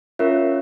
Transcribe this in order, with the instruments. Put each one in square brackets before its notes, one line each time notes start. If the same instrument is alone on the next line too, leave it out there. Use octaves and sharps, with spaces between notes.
[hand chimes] C#4 F4 A#4 C#5 E5